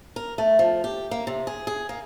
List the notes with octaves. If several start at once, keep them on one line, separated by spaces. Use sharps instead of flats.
A#4
A3
F3
G4
A#3
C3
G#4
G#4
A#3